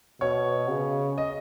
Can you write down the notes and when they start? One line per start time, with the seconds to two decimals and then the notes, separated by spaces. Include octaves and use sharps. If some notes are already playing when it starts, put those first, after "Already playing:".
0.21 B2 C#5
0.70 C#3
1.18 D#5